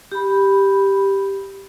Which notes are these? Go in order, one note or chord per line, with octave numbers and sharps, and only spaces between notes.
G4 B5